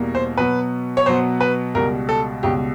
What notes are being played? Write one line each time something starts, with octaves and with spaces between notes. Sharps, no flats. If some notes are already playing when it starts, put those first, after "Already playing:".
Already playing: E2 B2 G3 A#3
C5
B2 F#3 B3 B4
C#5
B2 F#3 B3 C5
B4
C#2 B2 G3 A#4
A4
C#2 B2 G3 G4